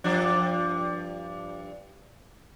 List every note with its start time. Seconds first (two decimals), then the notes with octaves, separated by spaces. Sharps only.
0.04 G2 F3 D4